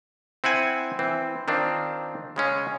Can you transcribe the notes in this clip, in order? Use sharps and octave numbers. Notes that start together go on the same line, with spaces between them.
C4 E4 F#5 G#5
E3 C4
D#3 C4 D4 F4
C#3 G#3 C#4